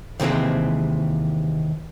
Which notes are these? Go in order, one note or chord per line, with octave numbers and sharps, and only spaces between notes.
D#2 C3 E3 G#3 C4